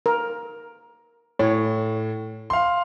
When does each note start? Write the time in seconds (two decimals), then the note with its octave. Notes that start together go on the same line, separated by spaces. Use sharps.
0.06 A#4
1.39 A2 C#5
2.50 F5 C6